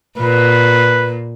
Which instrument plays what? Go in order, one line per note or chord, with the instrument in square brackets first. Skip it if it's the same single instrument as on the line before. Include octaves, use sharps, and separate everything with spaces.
[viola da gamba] A#2 [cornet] B4